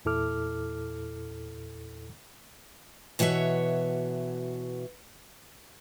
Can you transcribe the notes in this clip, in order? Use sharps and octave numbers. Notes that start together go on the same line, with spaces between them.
E2 A#2 E4 A4 D6 F6
B2 E3 F#4 C#5 E5